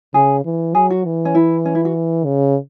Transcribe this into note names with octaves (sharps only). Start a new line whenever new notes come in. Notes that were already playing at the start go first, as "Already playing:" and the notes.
C#3 G#4
E3
F#3 G#4
F#4
E3
C#4
E4
C#4
E4
F#4
C#3